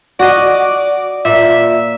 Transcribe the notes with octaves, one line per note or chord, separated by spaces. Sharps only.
F#4 D5 D#5
A#2 E5